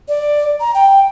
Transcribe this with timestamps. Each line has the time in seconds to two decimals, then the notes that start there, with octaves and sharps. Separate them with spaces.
0.08 D5
0.60 A#5
0.74 G5